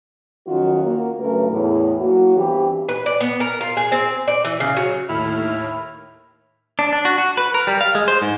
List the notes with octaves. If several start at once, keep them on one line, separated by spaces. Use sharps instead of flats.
F2 D#3 F#3 C#4 F4 F#4
A#3 F#4 A#4
G2 C#3 F#3 A3 A#4 B4
E2 A2
F#3 A#3 E4 F#4
G2 E3 B3 C4 G4
B4
D5
B3
A#4
F4
G#4
C4
D5
E3
C#3
F#3
D#2 A2 E4 F6
D4
D4
F#4
F#4
B4
A#4
G3
F5
G#3
C5
G#2